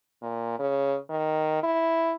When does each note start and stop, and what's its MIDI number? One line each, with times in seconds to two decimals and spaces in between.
0.22 0.58 46
0.59 0.97 49
1.09 1.59 51
1.63 2.14 64